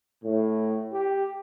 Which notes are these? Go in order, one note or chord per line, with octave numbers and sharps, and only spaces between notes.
A2
G4